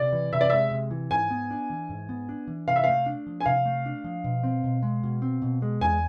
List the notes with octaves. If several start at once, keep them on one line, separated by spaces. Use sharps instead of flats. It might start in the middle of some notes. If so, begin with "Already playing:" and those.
Already playing: C3 D5
E3
C3 E5
D5
G#3 E5
C3
E3
G#2 G#5
B3
D4
E3
G#2
B3
D4
E3
C3 F5
E5
A3 F5
D4
F3
G#5
C3 F5
A3
D4
F3
B2
C4
B2
G#3
B2
C4
B2
G#3
E2 G#5